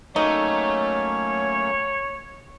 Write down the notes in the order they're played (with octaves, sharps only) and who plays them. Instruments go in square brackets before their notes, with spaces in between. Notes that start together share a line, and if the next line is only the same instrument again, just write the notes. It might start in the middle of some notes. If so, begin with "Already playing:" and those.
[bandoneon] F#3 A#3 C#4 [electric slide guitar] A3 [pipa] D#4 [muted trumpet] C#5